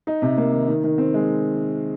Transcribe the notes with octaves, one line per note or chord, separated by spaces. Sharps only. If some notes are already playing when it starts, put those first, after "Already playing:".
D#4
C3
A#3
D#3
D#3
D#3
C4
G#3